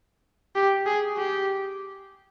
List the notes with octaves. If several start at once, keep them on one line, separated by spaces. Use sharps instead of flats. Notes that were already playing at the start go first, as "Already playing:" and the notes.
G4
G#4
G4